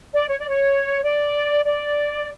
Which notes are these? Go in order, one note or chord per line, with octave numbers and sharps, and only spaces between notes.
D5
C#5
D5
C#5
D5
D5